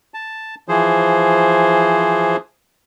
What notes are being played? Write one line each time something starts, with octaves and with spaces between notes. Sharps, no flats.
A5
E3 F3 G#4 C5